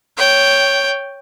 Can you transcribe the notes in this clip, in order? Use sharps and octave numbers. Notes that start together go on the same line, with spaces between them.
C#5 G5